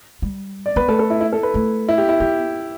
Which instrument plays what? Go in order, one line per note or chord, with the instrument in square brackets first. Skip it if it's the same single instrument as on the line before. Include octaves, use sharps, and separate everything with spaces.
[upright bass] G3
[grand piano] D5
[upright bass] B3 [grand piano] B4
[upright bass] A3 [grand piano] A4
[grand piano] A4
E4
E4
A4
B4
[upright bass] A3
[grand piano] E4
G4
E4
[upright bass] B3 [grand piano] G4